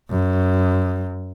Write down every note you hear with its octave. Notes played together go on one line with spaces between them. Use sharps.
F#2